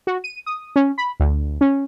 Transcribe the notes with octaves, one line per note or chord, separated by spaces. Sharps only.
F#4
D#7
D#6
C#4
B5
D2
C#4